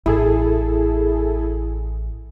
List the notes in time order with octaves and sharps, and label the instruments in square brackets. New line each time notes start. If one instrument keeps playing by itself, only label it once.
[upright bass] A1 [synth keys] E4 G#4 A4